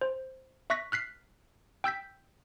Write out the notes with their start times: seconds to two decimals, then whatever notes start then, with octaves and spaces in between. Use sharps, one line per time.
0.01 C5
0.70 E5 C#6 F#6 A#6 B6
0.92 F6 F#6 B6 C7
1.84 G5 E6 G6 B6